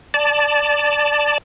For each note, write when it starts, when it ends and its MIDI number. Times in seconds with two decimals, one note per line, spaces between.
0.14 1.38 74
0.14 1.38 81